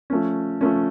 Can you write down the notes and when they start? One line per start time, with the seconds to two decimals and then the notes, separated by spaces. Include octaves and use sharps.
0.10 F3 A3 C#4
0.61 F3 A3 C#4